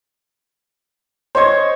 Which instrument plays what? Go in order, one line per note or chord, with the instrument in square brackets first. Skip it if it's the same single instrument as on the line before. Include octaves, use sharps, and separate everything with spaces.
[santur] C5 C#6 [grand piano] C#5 D#5 G#6